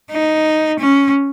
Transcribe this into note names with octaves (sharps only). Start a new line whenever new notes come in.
D#4
C#4